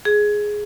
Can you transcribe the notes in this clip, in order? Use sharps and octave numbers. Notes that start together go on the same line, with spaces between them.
G#4